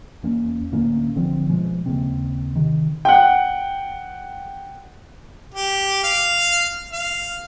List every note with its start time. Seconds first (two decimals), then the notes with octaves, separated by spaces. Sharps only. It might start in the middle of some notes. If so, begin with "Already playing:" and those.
0.23 E2 A#3 C#4
0.72 D2 A2 A#3 C#4
1.15 G#1 D3 F3 C4
1.49 B2 F3 G#3
1.86 D#2 C#3 A#3 C4
2.55 C3 D#3
3.05 F#5 G5
5.54 G4
6.03 F5
6.93 F5